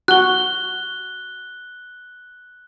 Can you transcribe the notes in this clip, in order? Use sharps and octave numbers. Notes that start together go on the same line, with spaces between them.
F#4 F#6 G7